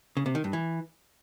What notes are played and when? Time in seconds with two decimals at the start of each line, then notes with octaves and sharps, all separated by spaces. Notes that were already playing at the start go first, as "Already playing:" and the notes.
0.17 C#3
0.26 C3
0.35 D#3
0.44 G2
0.53 E3